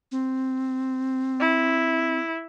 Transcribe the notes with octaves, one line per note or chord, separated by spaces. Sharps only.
C4
E4